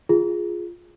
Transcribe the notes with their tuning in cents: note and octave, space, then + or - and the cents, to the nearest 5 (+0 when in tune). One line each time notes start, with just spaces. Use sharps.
F4 +0 G#4 +0